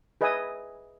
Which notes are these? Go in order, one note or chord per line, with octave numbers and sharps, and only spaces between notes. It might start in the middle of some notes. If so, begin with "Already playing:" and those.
G#4 B4 D#5 E5 G#5 D#6